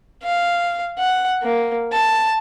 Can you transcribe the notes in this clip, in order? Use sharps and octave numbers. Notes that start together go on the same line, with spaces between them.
F5
F#5
A#3
A5